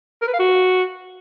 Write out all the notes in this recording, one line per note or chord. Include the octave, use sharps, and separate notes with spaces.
A#4
B4
F5
F#4